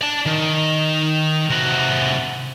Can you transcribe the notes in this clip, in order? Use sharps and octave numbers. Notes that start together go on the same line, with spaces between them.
D5 A5
D#3
C3 F#4